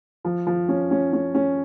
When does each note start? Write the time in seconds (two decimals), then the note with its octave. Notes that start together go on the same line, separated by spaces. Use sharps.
0.25 F3
0.47 F3
0.69 C#4
0.91 C#4
1.13 C#4
1.35 C#4